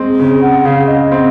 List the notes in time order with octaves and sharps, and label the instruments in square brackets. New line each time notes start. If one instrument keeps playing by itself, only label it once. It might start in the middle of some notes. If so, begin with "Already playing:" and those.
Already playing: [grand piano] G#3 C4
C#3
[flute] F#5
[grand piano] C#3 [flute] F5
[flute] D#5
[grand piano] C4